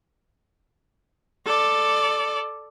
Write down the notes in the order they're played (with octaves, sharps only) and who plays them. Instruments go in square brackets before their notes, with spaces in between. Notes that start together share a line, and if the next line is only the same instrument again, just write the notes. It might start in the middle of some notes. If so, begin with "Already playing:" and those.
[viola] A4 D5